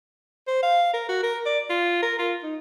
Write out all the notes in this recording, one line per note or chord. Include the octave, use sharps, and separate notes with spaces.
C5
F5
A#4
F#4
A#4
D5
F4
A#4
F4
D#4